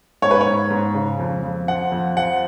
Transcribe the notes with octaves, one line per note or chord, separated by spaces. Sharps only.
G#2 C#5
B4
C#5
G#2
G#2
C#3
F2
F2
F3 F#5
F2
F3 F#5